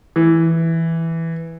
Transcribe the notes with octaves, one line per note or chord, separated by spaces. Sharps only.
E3